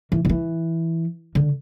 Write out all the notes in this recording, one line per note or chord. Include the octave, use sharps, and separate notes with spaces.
E3
D3
E3
D3